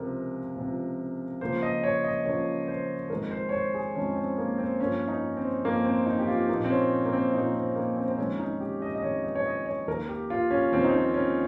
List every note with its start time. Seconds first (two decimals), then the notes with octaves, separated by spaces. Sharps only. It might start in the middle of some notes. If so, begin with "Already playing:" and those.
Already playing: C#2 C3 F3 A#4
0.56 C#2 C3 F3
1.41 C#2 C#3 F3 A#3 C5
1.62 D#5
1.83 C#5
2.04 D#5
2.26 C#2 C#3 F3 A#3 C#5
2.68 C5
3.10 F2 D#3 G#3 A#4
3.31 C5
3.49 C#5
3.52 C5
3.74 G#4
3.94 F2 D#3 G#3 C#4
4.16 C4
4.38 A#3
4.58 C4
4.79 G2 F3 A#3 C#4
5.08 D#4
5.37 C4
5.64 G2 F3 A#3
5.85 C4
6.06 D#4
6.19 G4
6.28 F4
6.49 A#2 F3 A#3 D#4
6.64 C4
6.69 C#4
7.05 A#3
7.13 C4
7.33 A#2 F3 A#3 D#4
7.55 C4
7.76 A#3
7.97 C4
8.08 C4
8.18 F2 D#3 G#3 C#4
8.39 D#4
8.60 G4
8.82 D#5
8.95 D#5
9.02 F2 D#3 G#3 C#5
9.23 D#5
9.35 C#5
9.46 D#5
9.66 C#5
9.88 D#2 D#3 A#3 A#4
10.09 G4
10.30 F4
10.50 C#4
10.72 D#2 D#3 A#3 C4
10.84 D#4
10.94 C#4
11.14 C#4